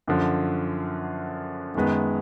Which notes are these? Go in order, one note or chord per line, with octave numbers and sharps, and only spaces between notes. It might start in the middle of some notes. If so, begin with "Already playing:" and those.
F#2 D3 F3
F#2 D#3 G#3 B3